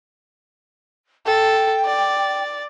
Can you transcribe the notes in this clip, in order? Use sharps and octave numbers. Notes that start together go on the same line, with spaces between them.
A4 G5
D5